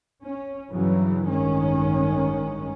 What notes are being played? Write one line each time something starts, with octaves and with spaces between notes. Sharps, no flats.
C#4
G2 C#3 E3 F#3
A1 G2 D#3 G#3 C#4